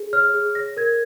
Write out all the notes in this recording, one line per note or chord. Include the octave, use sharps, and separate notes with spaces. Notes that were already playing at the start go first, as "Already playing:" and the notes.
Already playing: G#4
C#5 F6
G#4
C#5 A#6
A#4 G#6